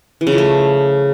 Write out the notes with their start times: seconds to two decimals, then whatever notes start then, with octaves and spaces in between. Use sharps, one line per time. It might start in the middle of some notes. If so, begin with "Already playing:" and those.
0.21 E3
0.27 C#3
0.32 F3
0.38 A3